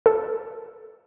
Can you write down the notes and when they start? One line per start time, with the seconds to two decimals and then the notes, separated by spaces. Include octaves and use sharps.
0.06 A4